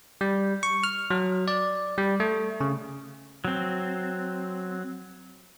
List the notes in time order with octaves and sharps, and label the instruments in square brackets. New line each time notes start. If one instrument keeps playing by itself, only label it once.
[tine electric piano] G3
C#6
F6
F#3
D5
G3
A3
C#3
[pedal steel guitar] F#3 C4